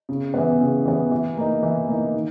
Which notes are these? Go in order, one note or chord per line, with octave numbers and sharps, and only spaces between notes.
C#3
E3 B3
C#3
E3 B3
E3
A#3 D#4
E3
A#3 D#4
D#3